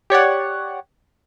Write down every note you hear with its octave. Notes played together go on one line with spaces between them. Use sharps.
G4 C#5 D5 F#5